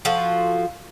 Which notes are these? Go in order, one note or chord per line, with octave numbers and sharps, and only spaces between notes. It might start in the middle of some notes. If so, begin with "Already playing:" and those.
F3 F4 F#4 A4